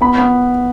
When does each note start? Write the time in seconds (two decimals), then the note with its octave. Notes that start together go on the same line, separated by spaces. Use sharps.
0.01 B3 B5
0.18 B3